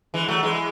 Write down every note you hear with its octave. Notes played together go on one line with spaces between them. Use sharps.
E3 G#3
F#3 A3
E3 G#3